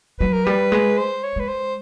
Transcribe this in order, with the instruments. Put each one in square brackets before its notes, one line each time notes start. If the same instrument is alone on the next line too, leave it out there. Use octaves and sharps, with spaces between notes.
[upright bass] F#3 [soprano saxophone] B4
[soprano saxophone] A#4
[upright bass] G3 [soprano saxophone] B4
[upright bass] G#3
[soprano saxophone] C5
C#5
[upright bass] G#3 [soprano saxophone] B4
[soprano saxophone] C5